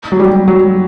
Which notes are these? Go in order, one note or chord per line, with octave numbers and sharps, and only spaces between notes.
F#3
G3
F#3